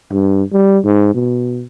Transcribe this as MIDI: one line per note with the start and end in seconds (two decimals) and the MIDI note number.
0.12 0.43 43
0.53 0.79 55
0.84 1.10 44
1.14 1.65 47